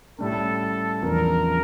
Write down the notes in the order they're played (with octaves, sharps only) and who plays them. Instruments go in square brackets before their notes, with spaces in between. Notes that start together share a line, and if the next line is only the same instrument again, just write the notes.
[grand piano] A2 G3 C#4 [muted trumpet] A4
[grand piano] E2 C#3 F3 A#3 D4 [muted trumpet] A#4